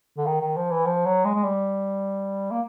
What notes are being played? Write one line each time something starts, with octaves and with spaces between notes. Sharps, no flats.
D3
D#3
D#3
F3
E3
F3
F#3
G#3
G#3
G3
A#3